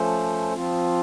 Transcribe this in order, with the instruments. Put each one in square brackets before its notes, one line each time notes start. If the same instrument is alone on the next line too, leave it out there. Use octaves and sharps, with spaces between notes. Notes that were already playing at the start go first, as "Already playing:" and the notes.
Already playing: [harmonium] F3 A3 C#4 A4 C5
F3 C4 F4